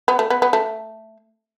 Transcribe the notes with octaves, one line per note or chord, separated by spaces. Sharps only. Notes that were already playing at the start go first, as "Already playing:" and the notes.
B3
A3
B3
B3
A3